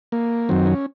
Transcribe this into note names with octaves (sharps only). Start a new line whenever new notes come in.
A#3
F#2 D#3 F#3 C4
C#4